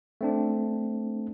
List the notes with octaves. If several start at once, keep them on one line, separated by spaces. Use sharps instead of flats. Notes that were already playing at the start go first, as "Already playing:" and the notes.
A3 C4 D4